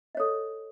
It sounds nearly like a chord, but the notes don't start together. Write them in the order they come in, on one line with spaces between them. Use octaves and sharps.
D#5 C#5 A4